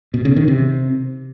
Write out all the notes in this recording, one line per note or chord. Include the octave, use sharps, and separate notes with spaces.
B2
C#3
D#3
C3